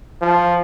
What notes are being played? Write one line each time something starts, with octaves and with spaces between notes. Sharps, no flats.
F3